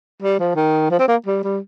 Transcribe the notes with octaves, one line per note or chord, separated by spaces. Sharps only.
G3
F3
D#3
F3
C4
A#3
G3
G3